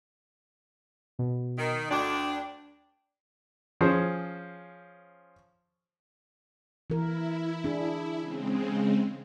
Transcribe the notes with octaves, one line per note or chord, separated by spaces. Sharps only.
B2
D#3
D2 D4 G5
F3 C#4 G#4 C5
E3 E4 A#4
D4 G#4
C#3 G#3 C4